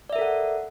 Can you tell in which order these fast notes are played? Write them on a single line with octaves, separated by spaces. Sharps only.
D5 E5 A#4 A4 F#5